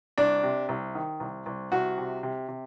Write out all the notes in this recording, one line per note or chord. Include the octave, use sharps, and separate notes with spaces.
C2 D4
C3
C2
D#3
C2
C2
C2 F#4
C3
C3
C3